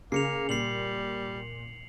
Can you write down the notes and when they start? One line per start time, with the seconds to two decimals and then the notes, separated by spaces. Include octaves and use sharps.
0.12 C#3 A#3 C7 C#7 F7
0.49 A#2 G3 C7 F#7